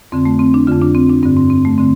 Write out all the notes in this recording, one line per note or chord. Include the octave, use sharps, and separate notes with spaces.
F2 D3 C4
A3
C4
D4
F2 D3 F4
D4
C4
D4
G2 D3 C4
C4
C4
A3
D3 C4